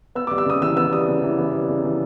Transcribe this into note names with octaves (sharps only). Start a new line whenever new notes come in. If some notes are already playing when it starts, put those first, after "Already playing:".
B3 E6
G3 D6
E6
C#3 D#6
E3 E6
B3 E6
G3 D#6
C#3
E3
B3
G3
C#3
E3